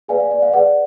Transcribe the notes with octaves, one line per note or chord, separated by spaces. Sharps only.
G#4 B4 D5 F5 G#5
F5
D5
F5
G#4 B4 D5 F#5